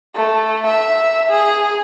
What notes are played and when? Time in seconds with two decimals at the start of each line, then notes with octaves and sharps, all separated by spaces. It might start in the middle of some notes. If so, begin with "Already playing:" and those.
0.15 A3
0.67 E5
1.31 G#4